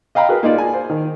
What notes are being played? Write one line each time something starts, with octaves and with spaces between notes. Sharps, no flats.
D#5 F5 G5 A#5 B5
F#4 G#4 A#4 B4
A#3 D#4 F4 D5
G#5
C5
D#3